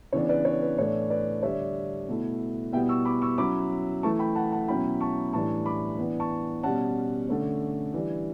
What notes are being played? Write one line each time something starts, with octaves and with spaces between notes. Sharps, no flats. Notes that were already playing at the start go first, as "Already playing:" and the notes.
C#3 E3 B3 D4 C#5
B4 D5
C#5
B4
A2 E3 A3 D4 C#5
B4 D5
D3 G3 D4 C#5 E5
B2 A3 E4
B2 G3 B3 E4 E5 G5
C#6 E6
B5 D6
C#6 E6
F#3 C#4 E4 B5 D6
E3 A3 E4 A5 C#6
G5 B5
F#5 A5
F#5 A5
B2 F#3 C#4 E4 G5 B5
A5 C#6
A2 E3 G3 D4 A5 C#6
B5 D6
E3 B3 D4
A5 C#6
B2 G3 C#4 F#5 A5
D3 A3 C#4
E3 G3 D4